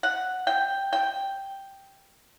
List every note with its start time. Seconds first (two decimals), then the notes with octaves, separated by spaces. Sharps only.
0.03 F#5
0.47 G5
0.93 G5